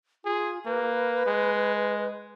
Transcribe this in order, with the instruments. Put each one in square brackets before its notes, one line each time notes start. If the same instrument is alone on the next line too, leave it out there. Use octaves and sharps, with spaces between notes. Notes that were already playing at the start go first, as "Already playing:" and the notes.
[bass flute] F4 [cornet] G#4
[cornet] A#3 [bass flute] B4
[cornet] G#3